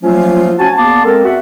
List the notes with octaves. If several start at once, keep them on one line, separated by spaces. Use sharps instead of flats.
F3 F#3 A3 A#3 C#4 F4
C#4 F#4 G#5 A5
E2 A#3 B3 A5 C6 D6
G#3 C4 A4 A#4
E2 F#4 E5 F#5